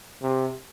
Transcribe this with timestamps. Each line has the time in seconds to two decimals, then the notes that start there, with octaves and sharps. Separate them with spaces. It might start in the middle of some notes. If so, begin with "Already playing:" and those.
0.22 C3